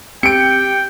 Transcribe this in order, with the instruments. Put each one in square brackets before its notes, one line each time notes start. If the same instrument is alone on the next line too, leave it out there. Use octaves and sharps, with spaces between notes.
[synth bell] C4 [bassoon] G4 [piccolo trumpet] G5 [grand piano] C#7 D7